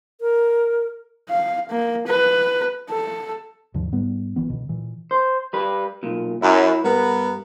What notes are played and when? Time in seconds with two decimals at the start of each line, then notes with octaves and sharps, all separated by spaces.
0.21 A#4
1.29 F5
1.69 A#3
2.07 B4
2.90 A4
3.74 D#2 G#2 D3 F3
3.92 G#2 G3 B3
4.36 G#1 E3 B3
4.48 C#2 B2 D3
4.69 A#2 E3
5.11 C5
5.53 G3 B4
6.03 B1 A#2
6.42 F#2 E4
6.84 G2 B3 A#4